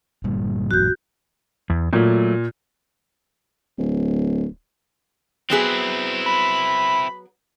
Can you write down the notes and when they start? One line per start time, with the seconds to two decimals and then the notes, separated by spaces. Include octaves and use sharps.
0.24 G1 A#2 G3
0.71 A1 F#2 A#2 F#4 F#6 G6
1.70 E2
1.93 A#2 F#3 A3
3.78 D1
5.50 F#3 B3 C4 E4 G#4
6.27 B5